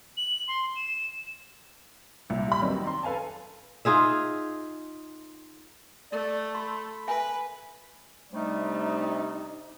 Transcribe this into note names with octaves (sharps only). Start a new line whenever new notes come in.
F#7
C6
E7
C2 A#2
G3 B5
D#3 F#3 G3 B3 C4 D#4
D5 A#5 C6
A4 B4 F5 G#5 A5
D#4 F4 G#4 E5
A3 D5
B5 C6
B4 E5 G#5
C3 G3 A3 D4 D#4